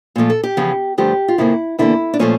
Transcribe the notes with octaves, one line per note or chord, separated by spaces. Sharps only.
A#2 F3 A3
A4
G4
E2 C#3 F3
G2 D3 F3 A3 G4
F4
F2 C#3 F3 A#3 E4
E2 D3 G3 A#3 E4
D4
A#2 F3 A3 C#4